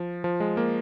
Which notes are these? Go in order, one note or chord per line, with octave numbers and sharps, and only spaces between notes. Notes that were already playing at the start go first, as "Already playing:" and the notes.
Already playing: F3
F3
G#3
A#3